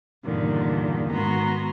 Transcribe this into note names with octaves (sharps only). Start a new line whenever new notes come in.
E2 G2 A#2 D3 D#3
G#2 D#3 B3 F#4 A#5 C6